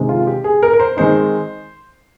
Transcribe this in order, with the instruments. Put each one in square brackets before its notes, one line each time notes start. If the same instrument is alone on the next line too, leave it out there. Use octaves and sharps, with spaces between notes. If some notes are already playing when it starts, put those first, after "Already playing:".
Already playing: [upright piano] C3 D#3 G#3 C4
F4
G4
G#4
A#4
A#4
C5
D#3 G#3 C4 D#4 C5